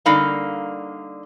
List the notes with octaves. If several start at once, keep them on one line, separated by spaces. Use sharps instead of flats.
D3 G3 A#3 D#4 F5